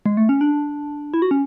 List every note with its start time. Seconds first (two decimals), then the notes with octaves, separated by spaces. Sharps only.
0.06 G#3
0.17 A3
0.29 C#4
0.41 D4
1.14 E4
1.22 F#4
1.31 C#4